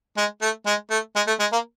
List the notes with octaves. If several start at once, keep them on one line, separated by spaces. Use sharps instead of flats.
G#3
A3
G#3
A3
G#3
A3
G#3
A#3